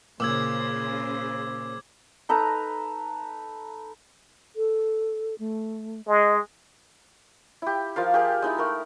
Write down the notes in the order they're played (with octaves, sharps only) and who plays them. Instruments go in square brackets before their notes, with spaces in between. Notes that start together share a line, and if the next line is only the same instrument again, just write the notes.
[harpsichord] A#2 [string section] C#3 C5 [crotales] D6 E6 G#6
[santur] D#4 A4 B4 A#5
[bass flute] A4
A3
[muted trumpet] G#3 [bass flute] D#5
[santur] E4 G4
F3 F4 A#4 F5
G4 G#4 A#4
G#3 D#4 E4
A3 A#4